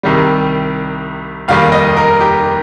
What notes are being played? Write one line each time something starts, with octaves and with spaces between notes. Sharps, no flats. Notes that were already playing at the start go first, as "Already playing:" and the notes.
C2 C3 D#3 G3
F1 D#2 D#3 G3 F5
D#5
A#4
G4